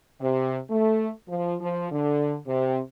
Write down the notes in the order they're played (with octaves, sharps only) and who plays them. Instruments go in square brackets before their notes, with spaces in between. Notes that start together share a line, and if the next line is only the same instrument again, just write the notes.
[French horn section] C3
A3
F3
F3
D3
C3